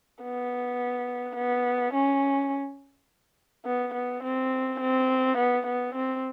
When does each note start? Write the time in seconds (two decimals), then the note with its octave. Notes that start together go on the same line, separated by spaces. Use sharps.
0.22 B3
1.36 B3
1.94 C#4
3.66 B3
3.94 B3
4.24 C4
4.80 C4
5.38 B3
5.67 B3
5.95 C4